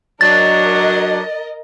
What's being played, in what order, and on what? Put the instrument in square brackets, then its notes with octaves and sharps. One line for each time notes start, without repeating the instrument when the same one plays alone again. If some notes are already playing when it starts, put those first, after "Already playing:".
[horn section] F#3 D4 [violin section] A#4 D#5 [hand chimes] A6